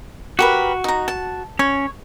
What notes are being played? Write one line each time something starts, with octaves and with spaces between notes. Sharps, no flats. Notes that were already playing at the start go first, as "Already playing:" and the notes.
F#4 G4 A#4 B4
D#4 A#5
A5
C#4 C#5